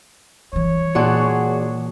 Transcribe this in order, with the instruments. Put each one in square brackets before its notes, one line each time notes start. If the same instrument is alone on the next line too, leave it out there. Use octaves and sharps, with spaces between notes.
[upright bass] E3 G3 [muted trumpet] C#5
[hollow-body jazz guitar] A#2 [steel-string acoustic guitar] D4 F#4 G#4